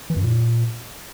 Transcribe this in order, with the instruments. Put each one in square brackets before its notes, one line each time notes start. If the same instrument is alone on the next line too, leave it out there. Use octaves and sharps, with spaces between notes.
[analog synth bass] E3
F#2
A#2